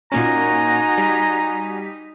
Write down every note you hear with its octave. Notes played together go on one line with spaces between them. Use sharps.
A#2 A#3 C#4 D#4 F#4 G#5 A#5
G3 B6